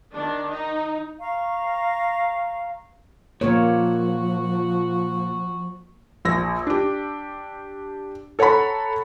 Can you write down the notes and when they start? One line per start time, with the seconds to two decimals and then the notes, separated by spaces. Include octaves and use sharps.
0.13 D#3 D4
0.51 D#4
1.20 F5 A#5 C#6
3.41 A#2 F3 A#3 F#4 A#4 C#5
6.25 A#1 E6 A#6
6.67 D4 G4
8.39 A4 C#5 F#5 A#5 B5